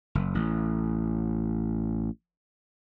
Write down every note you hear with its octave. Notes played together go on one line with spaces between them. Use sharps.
F#1
A1